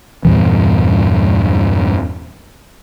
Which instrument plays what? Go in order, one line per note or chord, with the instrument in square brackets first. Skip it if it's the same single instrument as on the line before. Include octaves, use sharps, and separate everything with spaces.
[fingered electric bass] E2 G2 A#2 E3